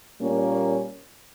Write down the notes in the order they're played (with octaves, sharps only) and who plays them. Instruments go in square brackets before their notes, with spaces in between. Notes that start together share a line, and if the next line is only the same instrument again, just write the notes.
[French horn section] A#2 G3 A#3 C#4